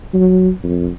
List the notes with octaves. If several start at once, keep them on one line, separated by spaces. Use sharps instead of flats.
F#3
F2